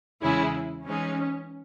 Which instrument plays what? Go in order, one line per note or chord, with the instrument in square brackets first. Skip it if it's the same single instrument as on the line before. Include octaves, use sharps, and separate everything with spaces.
[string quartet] E2 C#3 G#3 C#4 G#4 [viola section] E4
[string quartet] E3 G#3 D#4 G#4 [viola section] C#4